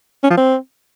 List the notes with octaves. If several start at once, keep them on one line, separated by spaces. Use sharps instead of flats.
C#4
F3
C4